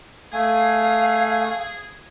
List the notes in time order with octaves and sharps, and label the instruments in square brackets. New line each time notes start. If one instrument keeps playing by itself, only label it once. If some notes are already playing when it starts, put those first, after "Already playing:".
[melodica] A3 G#5 [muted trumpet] G#4 [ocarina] F5